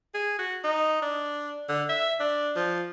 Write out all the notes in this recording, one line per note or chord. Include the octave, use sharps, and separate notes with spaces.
G#4
F#4
D#4
D4
D3
E5
D4
F3